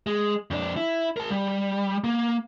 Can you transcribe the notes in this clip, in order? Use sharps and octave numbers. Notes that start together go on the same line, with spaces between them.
G#3
F2 D4
E4
A#4 A5
G3
A#3